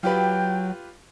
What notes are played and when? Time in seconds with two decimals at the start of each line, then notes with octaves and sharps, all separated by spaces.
0.03 F#3 F4 G4 B4 G5